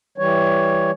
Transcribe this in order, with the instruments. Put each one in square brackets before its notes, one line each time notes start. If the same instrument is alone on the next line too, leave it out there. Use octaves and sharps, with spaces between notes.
[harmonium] E3 G3 C#5